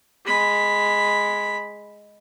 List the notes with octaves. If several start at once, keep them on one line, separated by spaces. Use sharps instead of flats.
G#3 B5